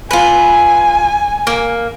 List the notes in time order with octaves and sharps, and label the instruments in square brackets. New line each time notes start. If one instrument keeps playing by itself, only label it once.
[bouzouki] F4 B4 [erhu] G#5
[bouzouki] A#3